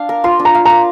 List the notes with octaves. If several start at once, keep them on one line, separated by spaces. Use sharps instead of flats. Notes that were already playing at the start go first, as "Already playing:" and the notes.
Already playing: D4 F5
A#4
F4 C6
D4
A#5
F5
A#4 A#5